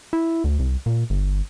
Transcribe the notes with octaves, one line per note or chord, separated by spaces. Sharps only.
E4
D2
C2
A#2
G1